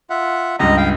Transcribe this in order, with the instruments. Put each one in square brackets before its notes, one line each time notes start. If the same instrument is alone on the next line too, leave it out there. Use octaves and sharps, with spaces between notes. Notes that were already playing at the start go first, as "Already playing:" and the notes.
[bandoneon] F4 E5 F#5
[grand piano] C#2 G2 [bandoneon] D#5 A#5
[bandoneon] F5 G5